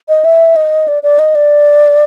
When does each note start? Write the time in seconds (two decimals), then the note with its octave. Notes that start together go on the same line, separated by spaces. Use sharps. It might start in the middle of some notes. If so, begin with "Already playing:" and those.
0.09 D#5
0.25 E5
0.56 D#5
0.88 D5
1.03 D5
1.19 D#5
1.35 D5